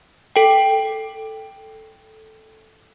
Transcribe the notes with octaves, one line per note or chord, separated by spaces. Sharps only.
A4 G5